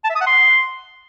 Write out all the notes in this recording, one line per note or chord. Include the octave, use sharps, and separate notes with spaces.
A5
E5
D#6
F#5
C6